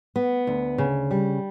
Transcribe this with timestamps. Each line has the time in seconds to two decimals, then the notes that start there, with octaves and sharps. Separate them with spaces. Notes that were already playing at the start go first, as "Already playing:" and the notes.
0.16 B3
0.47 D2
0.78 C#3
1.11 G3